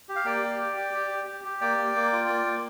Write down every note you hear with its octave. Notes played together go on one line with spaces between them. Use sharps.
G4
F5
A#3 D5 G5
G4
G4
G4
G4
G4
G4
G4
A#3 D5 G5
A#3
A#3
F4
A#3
A#3